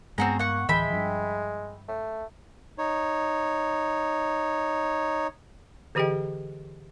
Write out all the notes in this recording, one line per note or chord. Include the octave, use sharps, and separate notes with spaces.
G2 G#3 B3 C4 F#4 G#4 A#5
A#3 F#5 C#6
D1 E3 G#3 E5 G5 B5
G2 F3
A3
D#4 C#5
D3 E3 G4 G#4 D#5 G5